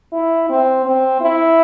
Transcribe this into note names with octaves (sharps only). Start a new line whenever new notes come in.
E4
C4
C4
E4